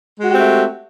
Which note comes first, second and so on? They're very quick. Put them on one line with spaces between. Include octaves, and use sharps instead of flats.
G#3 F#4 G4 C4 A3